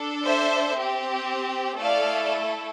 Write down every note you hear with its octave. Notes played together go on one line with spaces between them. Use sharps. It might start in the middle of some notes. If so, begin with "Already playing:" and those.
Already playing: D4 A4
C5 E5
C4 G4
A3 E4 A4 D5 F5